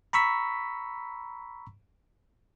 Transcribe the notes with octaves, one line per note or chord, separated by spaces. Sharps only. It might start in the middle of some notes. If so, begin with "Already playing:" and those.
A#5 B5 C#6 E6 B6